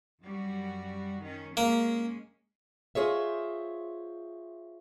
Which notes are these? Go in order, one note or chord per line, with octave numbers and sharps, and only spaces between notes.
F#2 G3 F#4
D#3 C#4
G#3 A#3 C#4
F4 G#4 C5 C#5 D#5 E5